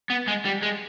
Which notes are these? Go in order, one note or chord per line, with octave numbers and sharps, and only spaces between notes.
B3
G#3
G3
G#3